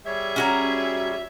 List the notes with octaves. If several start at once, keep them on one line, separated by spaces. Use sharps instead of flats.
G3 G#4 C#5 E5
C#4 F#4 A#5